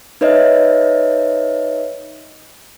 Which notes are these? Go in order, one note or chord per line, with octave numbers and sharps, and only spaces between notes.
D#4 B4 C#5 D#5 E5